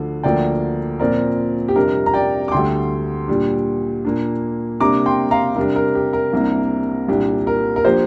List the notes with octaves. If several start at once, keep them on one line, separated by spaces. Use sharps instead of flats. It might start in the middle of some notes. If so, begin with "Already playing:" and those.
Already playing: D2 D3 F3
D2 D3 F3 A#3 D5 G5
A#2 F3 C4 A#4 D5
G4
F2 C3 G3 D4 A#4
A#5
D5 G5
D6
D2 D3 G3 G5 C6
A#2 G3 D4
A#2 A#3 D4
C3 G3 A#3 D4 A#5 D6
G5 C6
F5 A#5
C3 G3 D4 A#4
A#4
G4
A#4
C2 C3 A#3 D4
C2 A#2 A#3 D4 G4
A#4
A#4
F3 A#3 D4 G4 C5